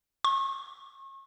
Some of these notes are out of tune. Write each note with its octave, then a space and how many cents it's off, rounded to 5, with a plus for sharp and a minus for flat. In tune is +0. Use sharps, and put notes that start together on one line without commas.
C#6 -35